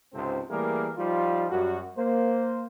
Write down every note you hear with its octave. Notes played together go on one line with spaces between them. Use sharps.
C#2 G#2 C3 C4 A4 C5
E3 G3 A3 A#3 G#4 A#4
F3 G3 D#4 F4
F#2 G3 F#4
A#3 C5